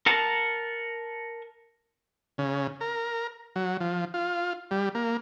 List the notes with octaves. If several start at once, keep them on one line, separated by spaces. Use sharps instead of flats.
A#4 F#5 A5 A#5
C#3
A#4
F#3
F3
F4
G3
A#3